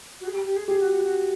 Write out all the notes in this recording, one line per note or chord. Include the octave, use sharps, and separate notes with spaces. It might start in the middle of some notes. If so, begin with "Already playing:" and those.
F#4
G#4
G4
G4
G#4
G4 G#4
F#4
F#4
F#4